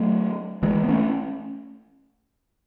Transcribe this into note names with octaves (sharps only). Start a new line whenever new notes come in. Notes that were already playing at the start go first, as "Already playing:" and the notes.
Already playing: F#3 A3
E3 G#3
B3
A3 C#4